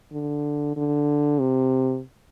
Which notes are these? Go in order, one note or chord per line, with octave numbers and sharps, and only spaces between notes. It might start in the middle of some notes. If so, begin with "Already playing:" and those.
D3
D3
C3